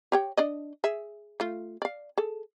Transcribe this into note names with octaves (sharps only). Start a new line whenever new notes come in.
G4 C#5 G5
D4 D5 D#5
G#4 E5
A3 F4
D5 F5
G#4 A4